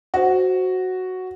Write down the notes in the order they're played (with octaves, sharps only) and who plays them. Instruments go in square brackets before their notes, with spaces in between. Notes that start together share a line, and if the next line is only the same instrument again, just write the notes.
[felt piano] F#4 [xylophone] C5 F#5